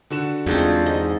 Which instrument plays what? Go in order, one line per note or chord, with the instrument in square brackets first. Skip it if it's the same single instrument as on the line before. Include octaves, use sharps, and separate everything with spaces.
[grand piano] D3 F#4 E7
[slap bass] E2 [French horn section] G#3 F4 [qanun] C4 D4 D#4
[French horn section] G#2 G#3 D#4 [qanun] D#5